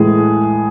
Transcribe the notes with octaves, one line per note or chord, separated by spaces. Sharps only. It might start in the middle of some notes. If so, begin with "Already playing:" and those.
Already playing: A2 E3 G#3 G#4